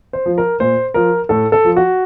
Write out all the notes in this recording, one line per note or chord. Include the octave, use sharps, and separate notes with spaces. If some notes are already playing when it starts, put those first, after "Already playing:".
C5
F3
A#4
A#2 C5
F3 A#4
A2 A4
A4
F3
F#4